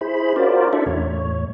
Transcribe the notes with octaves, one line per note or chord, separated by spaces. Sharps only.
E4 G#4 C5 B5
C#4 F4 F#4 A#4 C5 D5
D4 E4 A4 D5 E5
E2 A2 C#5